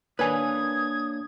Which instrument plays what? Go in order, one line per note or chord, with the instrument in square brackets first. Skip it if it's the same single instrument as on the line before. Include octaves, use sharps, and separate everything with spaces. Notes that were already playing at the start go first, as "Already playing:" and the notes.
[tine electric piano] A#3 D4 C#5 [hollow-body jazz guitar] B4 G#5 [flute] D#6 [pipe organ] G#6